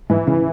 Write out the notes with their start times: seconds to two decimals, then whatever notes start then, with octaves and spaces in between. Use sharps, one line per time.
0.10 G#2 E3
0.27 C#3